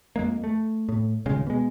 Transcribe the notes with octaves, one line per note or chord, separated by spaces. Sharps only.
F2 G#3 A#3
A3
A2
D#1 C#3 G#3
B2 G#3